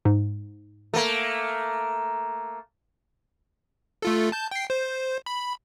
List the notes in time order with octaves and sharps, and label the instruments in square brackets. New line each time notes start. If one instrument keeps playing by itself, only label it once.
[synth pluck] G#2
[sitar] A3 A#3
[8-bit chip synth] A3 F4 A4
A5 G6
G5 C7
C5
B5